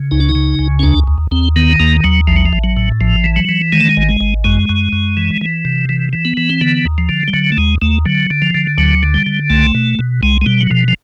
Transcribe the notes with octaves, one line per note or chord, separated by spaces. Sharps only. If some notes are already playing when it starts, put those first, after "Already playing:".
Already playing: C#3
C#2 D#4
D4
D#4
C#3
C#2
C#4
D#2 D4
D#2
D#2 C4
D#3 B3
D#2 A#3
D#2 F#3
A1 F3
F#3
F3
A1
F#3
A2
A1 F3
E3
F#3
E3
D#3 G#3
A3
G#3
G#1
G#3
G#1
F#2 G#3
F#2
F#2
E3
E3
C3
E3
E3
B3
E3
C4
D3 B3
D#2
F3
D3
G3
D3 F#3
A3
D#2 G#3
D#2 A3
D3 F#3
D3
F3
D3
D2 F#3
D3
G3
D3
C2 A3
B2
B2
C2 G#3
G#3
B2 G3
F#3
B2 F3
F3